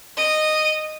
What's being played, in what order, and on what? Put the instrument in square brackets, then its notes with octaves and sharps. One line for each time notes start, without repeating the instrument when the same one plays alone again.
[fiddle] D#5